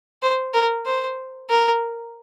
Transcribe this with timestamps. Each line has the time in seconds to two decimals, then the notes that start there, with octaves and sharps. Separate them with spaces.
0.22 C5
0.54 A#4
0.86 C5
1.50 A#4